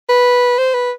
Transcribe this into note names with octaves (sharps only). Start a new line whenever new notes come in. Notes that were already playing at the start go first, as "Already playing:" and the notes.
B4
C5
B4